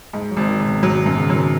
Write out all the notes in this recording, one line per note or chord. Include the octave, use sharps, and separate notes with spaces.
G#2 G#3
F#3
G#1
D#3
G#1
B2
G#2 F#3
B2
F#2
C#3
D#3 F#3